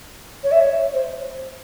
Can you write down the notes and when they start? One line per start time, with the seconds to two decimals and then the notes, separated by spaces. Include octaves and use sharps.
0.44 C#5
0.52 E5
0.61 C#5
0.94 C5